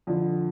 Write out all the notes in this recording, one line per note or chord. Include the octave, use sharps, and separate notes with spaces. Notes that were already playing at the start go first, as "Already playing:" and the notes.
F2 D3 F3